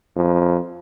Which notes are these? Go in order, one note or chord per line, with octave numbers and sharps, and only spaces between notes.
F2